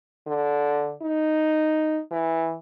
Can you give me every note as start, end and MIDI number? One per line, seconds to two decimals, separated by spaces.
0.27 0.93 50
1.02 2.00 63
2.11 2.56 52